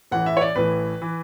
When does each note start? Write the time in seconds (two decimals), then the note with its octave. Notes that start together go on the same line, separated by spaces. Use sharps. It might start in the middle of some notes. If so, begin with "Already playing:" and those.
0.11 A1 A2 E3 F#5
0.26 E5
0.37 C#5
0.41 D5
0.56 A1 A2 E3 B4
1.02 E3